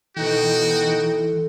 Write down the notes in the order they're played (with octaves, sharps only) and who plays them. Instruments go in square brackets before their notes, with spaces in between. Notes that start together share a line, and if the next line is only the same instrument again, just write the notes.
[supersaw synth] B2 D#4 G5 [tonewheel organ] E3 [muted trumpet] F#4 [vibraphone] A4